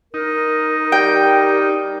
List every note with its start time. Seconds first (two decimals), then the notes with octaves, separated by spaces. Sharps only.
0.14 D#4 A#4
0.92 G3 G5